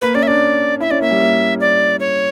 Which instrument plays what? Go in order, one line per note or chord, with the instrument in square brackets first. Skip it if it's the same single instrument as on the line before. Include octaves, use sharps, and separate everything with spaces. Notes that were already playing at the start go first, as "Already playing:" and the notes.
[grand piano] A#3 [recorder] B4
[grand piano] C#4 [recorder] D5
[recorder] E5
[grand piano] D4 [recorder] D5
[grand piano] E4 [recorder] E5
[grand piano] C#4 [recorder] D5
[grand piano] A#3 [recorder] E5
[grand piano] G3
A#3
[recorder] D5
C#5